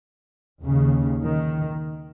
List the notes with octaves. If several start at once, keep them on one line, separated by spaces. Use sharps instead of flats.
D#2 C#3
D#3